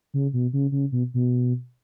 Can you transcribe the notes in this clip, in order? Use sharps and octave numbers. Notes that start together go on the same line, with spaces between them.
C#3
B2
C#3
C#3
B2
B2